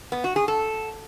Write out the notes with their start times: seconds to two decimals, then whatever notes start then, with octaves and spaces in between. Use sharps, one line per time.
0.12 B3
0.24 F#4
0.36 G#4
0.48 A4